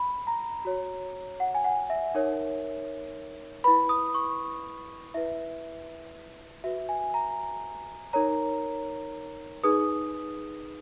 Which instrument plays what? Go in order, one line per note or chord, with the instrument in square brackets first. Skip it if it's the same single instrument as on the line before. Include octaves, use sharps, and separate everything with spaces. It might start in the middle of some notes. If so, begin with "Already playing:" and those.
Already playing: [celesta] B5
A#5
F#4 C#5
F#5
G#5
F#5
E5
D#4 A#4 C#5
E4 B4 B5
D#6
C#6
E4 B4 E5
F#4 B4 E5
G#5
A#5
D#4 A#4 C#5 A#5
D#4 G#4 B4 D#6